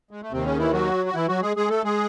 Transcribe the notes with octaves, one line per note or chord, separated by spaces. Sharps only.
G#3
A3
D#2 C3 D#3 C4
C#3 C#4
E3 E4
F#3 F#4
F#4
E3 E4
F#3 F#4
G#3 G#4
G#3 G#4
A3 A4
G#3 G#4